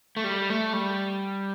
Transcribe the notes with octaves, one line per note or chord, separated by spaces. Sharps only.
A3
G3
A3
G3